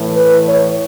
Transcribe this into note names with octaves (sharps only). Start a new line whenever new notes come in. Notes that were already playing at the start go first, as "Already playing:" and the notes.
Already playing: A2 E3
B4
C#5